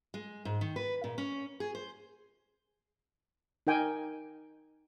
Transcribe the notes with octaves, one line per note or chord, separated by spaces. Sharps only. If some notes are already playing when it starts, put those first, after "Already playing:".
G#3
G#2
D#3
B4
A#2
C#4
G#4
C5
D#4 A#4 G5 G#5